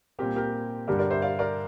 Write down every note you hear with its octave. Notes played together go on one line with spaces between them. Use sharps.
A#2 G3 C4 G4 A#4
G4 A#4
G2 D3 G3 D4 G4 A#4
A#4 D5
C5 E5
D5 F5
A#4 D5